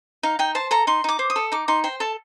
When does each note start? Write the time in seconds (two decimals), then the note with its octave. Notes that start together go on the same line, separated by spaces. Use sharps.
0.23 D#4 F5
0.39 D#4 G5
0.55 C5 A5
0.71 A4 A#5
0.87 D#4 C6
1.04 D#4 D6
1.19 C5
1.30 D#6
1.36 A4
1.52 D#4 D6
1.68 D#4 C6
1.84 C5 G5
2.00 A4 A5